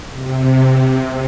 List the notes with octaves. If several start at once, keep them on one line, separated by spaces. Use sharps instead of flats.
C3